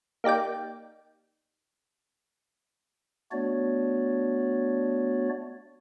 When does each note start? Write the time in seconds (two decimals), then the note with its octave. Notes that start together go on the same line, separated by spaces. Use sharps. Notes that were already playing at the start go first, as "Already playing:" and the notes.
0.24 A#3 D#4 G4 D5 G5
3.32 A3 B3 D4 F#4 C#5 D5